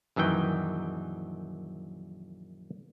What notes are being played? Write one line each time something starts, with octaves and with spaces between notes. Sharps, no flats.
A#1 F#2 D#3 E3 G5